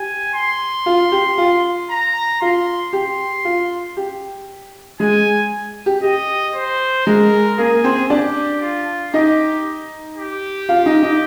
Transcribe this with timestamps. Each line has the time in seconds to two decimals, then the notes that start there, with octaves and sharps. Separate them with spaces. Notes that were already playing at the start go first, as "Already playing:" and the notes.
Already playing: G4 G#5
0.34 C6
0.86 F4
1.12 G4
1.38 F4
1.90 A#5
2.41 F4 C6
2.93 G4 C6
3.45 F4
3.97 G4
5.00 G#3 G#4 G#5
5.86 G4
6.03 G4 D#5
6.55 C5
7.06 G#3 G#4 A#4
7.58 A#3 G#4 A#4
7.84 C4 C5
8.10 D4 G4 D5
8.62 F4
9.14 D#4 G4 D#5
10.17 G4
10.69 F4 F5
10.86 D#4 D#5
11.03 D#4 D#5